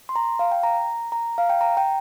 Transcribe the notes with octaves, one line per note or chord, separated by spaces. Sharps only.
C6
A#5
F5
G5
A#5
A#5
F5
G5
A#5
G5